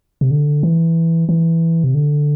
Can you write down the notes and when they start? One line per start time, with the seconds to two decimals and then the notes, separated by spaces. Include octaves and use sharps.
0.21 C3
0.31 D3
0.63 E3
1.29 E3
1.84 C3
1.95 D3